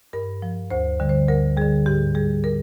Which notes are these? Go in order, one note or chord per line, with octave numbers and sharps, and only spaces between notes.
G2 A#4
F3
D2 C5
D3 G3
C5
D2 A#4
D3 G3 G#4
G#2 G4
G3 G#4
A#4